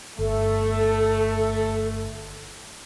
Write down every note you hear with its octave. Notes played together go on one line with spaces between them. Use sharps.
G1 A3 A4